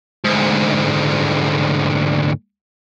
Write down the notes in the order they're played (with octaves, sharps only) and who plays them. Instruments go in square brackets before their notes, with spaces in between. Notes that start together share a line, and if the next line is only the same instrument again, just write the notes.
[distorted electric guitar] D2 G#2